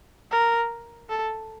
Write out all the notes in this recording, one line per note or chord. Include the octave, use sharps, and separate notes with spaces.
A#4
A4